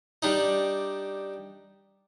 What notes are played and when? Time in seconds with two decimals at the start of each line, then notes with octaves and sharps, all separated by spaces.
0.22 G3 D4 D#4